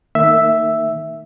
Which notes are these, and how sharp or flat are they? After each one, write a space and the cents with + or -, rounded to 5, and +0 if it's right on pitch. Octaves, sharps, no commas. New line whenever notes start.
D#3 +0 A#3 -40 E5 +0